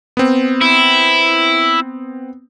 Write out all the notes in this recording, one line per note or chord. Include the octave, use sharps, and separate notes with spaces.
B3 C4
E4